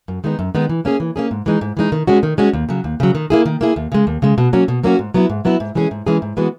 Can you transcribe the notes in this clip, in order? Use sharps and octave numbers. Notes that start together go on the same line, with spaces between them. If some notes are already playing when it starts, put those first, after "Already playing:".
F#2
D#3 G#3 B3 D#4
F#2
D#3 G#3 B3 D#4
E3
A#3 C#4 G#4
E3
A#3 C#4 G#4
G#2
E3 G#3 D#4
G#2
E3 G#3 D#4
D#3
G#3 C#4 F#4
D#3
G#3 C#4 F#4
D#2
C#3 F#3
D#2
C#3 F#3
D#3
A#3 E4 G#4
D#3
A#3 E4 G#4
D#2
C#3 G#3
D#2
C#3 G#3
B2
F#3 A#3 C#4 F#4
B2
F#3 A#3 C#4 F#4
G#2
F#3 B3 E4
G#2
F#3 B3 E4
G#2
E3 G#3 C#4 G#4
G#2
E3 G#3 C#4 G#4
G#2
E3 G#3 B3 F#4